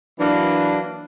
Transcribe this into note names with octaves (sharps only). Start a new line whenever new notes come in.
E3 F#3 A#3 D4